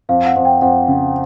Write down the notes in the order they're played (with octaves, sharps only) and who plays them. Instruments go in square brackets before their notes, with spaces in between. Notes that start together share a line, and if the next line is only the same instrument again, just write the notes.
[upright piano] F2 [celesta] F5
[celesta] F#5
[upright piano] F2
[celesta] G5
[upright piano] F2 [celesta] F#5
[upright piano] C#3